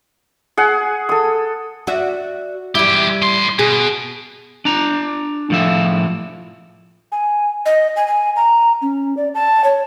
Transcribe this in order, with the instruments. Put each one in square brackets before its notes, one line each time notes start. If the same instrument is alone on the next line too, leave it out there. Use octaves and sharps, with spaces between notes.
[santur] G#4 F#5
A4 D#6
[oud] F#4 D5 E5
[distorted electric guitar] E2 G4 [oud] G3 E4
[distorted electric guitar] A2 C6
[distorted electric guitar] B2 [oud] G#4
[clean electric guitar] D4 A#5
A2 F3 E5
[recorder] G#5
D#5
G#5
G#5
A#5
C#4
D5
A5
C#5